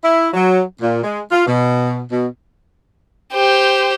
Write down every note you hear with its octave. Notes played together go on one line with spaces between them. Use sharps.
E4
F#3
A#2
G#3
F4
B2
B2
G4 C5